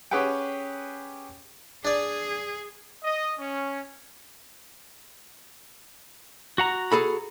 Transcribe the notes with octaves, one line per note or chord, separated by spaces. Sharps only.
C#4 G4 G#4 B4 F#5 G5
D4 G#4 D5
D#5
C#4
F#4 F#5 A#5
G#4 A4 B5